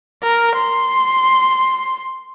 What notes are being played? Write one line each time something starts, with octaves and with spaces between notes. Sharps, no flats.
A#4
C6